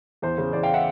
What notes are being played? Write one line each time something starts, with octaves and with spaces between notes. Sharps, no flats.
E2 C5
C#3
E2 C5 D5
F5 G5
E5 F#5